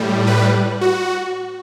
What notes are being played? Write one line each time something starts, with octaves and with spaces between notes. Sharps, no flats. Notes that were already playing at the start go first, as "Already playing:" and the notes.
Already playing: A2 G3
B4
F#4